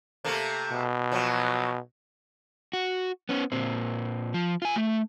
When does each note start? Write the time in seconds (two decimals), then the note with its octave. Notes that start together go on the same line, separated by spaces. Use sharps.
0.24 C3 A3 A#3
0.72 B2
1.12 F3 F#3
2.73 F#4
3.29 B3 C#4
3.52 A#2 C4
4.34 F3
4.62 F4 G#5
4.76 A3